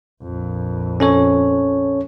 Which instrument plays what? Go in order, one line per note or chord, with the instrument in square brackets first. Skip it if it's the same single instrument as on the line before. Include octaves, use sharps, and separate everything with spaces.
[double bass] A#1 F2
[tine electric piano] C#4 A4 C#5